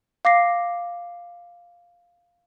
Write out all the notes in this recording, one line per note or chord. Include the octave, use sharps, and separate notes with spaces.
F5 D6 A#6 C7